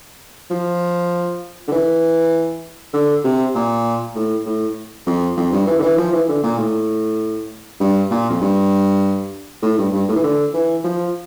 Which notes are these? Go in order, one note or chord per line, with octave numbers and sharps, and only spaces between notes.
F3
D3
E3
D3
C3
A#2
A2
A2
F2
F2
G2
E3
D3
E3
F3
E3
D3
A#2
A2
G2
A#2
F2
G2
A2
G2
G2
A2
E3
D3
E3
F3